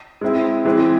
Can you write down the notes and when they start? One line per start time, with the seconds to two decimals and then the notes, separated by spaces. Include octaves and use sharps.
0.21 G#3 C4 E4
0.65 E3 G#3 C4